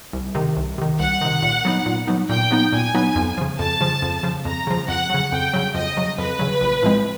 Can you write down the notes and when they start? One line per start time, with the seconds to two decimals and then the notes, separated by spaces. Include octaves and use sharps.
0.13 C2
0.35 C3 D#3
0.57 C2
0.78 C3 D#3
0.99 C2 F#5
1.21 C3 D#3
1.42 A#2
1.65 F#3 B3 D#4
1.86 A#2
2.07 F#3 B3 D#4
2.29 A#2 G5
2.51 F#3 B3 D#4
2.72 A#2 G#5
2.94 F#3 B3 D#4
3.16 F2
3.38 C#3 F3
3.59 F2 A5
3.81 C#3 F3
4.02 F2
4.23 C#3 F3
4.45 F2 A#5
4.67 C#3 F3
4.88 F2 F#5
5.10 C#3 F#3
5.32 F2 G5
5.53 C#3 F#3
5.75 F2 D#5
5.97 C#3 F#3
6.18 F2 B4
6.39 C#3 F#3
6.61 A#1
6.83 A2 F3 G#3 C4